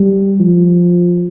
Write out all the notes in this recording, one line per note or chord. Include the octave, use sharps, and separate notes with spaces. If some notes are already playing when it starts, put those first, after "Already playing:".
Already playing: G3
F3